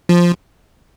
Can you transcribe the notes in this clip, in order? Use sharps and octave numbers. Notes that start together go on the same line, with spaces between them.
F3